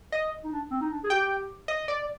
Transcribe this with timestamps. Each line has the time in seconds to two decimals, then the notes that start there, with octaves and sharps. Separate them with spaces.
0.12 D#5
0.44 D#4
0.52 D4
0.70 C4
0.81 D#4
0.90 D4
1.04 G#4
1.10 G4 G5
1.68 D#5
1.88 D5